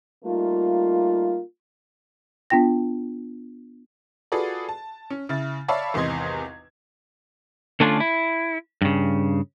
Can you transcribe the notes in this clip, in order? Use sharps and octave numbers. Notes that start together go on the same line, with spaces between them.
G3 A3 A#3 D#4 F4
B3 D4 F4 G5 A#6
F4 F#4 G#4 A4 B4 D5
A5
C#4
C#3 E4 A6
C#5 D5 E5 F5 A5 B5
G#1 E2 C3 D#5 C6 G#6
D3 A3 C#4 D4 F4
E4
G2 C#3